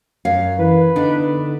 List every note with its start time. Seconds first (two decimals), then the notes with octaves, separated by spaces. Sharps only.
0.25 F#2 C#5 F5
0.59 E3 B4
0.96 D3 B3 D4 D#4